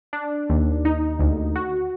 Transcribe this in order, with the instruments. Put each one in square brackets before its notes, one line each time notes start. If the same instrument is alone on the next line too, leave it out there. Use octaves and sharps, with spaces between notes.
[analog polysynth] D4
D#2
D#4
D2
F#4